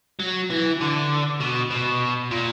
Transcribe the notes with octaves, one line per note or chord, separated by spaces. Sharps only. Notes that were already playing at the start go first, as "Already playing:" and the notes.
F#3
E3
D3
B2
B2
A#2